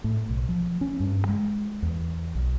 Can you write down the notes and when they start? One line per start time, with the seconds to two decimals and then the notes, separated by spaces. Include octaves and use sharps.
0.04 A2
0.29 B1
0.49 F3
0.81 C#4
1.00 G2
1.29 G#3
1.82 E2
2.35 B1